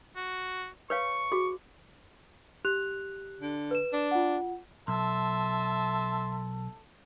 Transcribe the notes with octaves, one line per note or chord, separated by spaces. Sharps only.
F#4
B4 C#5 F5 C#6
F#4 G#4
G4 F#6 F7
D3
B4 E7
D4
F4 F#5
B1 A4 E5 A5 C6